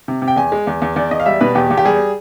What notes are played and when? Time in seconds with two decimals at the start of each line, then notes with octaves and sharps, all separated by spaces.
0.08 C3
0.22 C3
0.28 G5
0.36 E2 G#5
0.52 G#3
0.67 E2
0.82 E2
0.96 E2 D5
1.11 E2 D#5
1.20 F5
1.26 G3 E5
1.40 B2 B4
1.55 E2 G4
1.71 E2
1.78 G4
1.85 G3 G#4